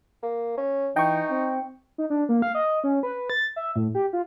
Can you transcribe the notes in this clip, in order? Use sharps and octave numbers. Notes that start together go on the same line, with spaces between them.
A#3
C#4
E3 D#4 G5 C#6
C4
D#4
D4
A#3
F5
D#5
C#4
B4
A6
E5
A2
G4
F4